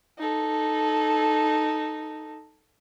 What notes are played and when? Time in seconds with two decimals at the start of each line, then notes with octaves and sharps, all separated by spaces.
0.19 D#4 A4